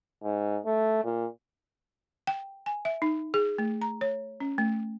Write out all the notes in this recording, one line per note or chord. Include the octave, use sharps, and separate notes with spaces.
G#2
A3
A#2
G5
G#5
E5
D#4
G#4
A3
A#5
C#5
C#4
A3